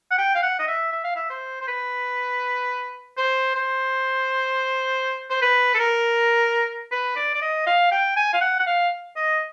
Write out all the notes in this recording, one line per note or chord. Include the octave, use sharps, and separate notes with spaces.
F#5
G5
F5
F#5
D#5
E5
E5
F5
E5
C5
C5
B4
C5
C5
C5
B4
A4
A#4
B4
D5
D5
D#5
F5
G5
G#5
F5
F#5
F#5
F5
D#5